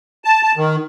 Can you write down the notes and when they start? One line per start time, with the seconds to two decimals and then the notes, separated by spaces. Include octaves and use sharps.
0.24 A5
0.43 A5
0.57 D#3